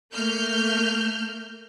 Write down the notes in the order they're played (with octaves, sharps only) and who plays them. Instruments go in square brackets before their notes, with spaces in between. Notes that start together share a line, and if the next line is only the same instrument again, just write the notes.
[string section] A3 A#3 F6 G6